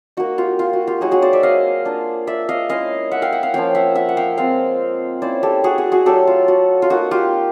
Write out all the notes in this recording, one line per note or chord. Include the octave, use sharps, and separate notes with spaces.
A#3 D#4 F#4
F4 G4
F4
F#4
F4 G4
F#3 A#3 D#4 F#4 G#4
F#4 G#4
C5 D5
D5 E5
D#5 F5
A#3 D4 F4
D5 E5
D#5 F5
G#3 C#4 E4 D#5 F5
E5 F#5
F5 G5
E5 F#5
F5 G5
F3 A#3 C#4 F4 F5 G5
E5 F#5
E5 F#5
F#5
F5 G5
G#3 C4 F4 F5 G5
A#3 C#4 E4 C5 D5
G4 A4
F#4 G#4
F#4 G#4
F#4 G#4
F#3 A3 D4 G4 A4
F4
F#4
F4
A#3 D#4 F#4
F4 G4